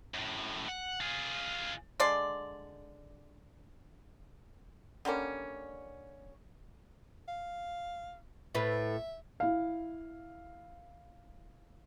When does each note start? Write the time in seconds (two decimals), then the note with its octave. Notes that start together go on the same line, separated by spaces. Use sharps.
0.14 F#2 A2
0.68 F#5
1.01 F4 G#4
2.00 D3 G#3 D5 C6
5.05 D3 G3 A#3 C#4
7.28 F5
8.55 A2 B4 E5
9.40 E4 F5